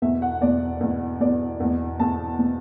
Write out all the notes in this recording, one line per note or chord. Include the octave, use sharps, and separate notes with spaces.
E2 B2 E5
F#5
E2 B2 D5
E2 B2
E2 B2 D5
E2 B2
E2 B2 A5
B2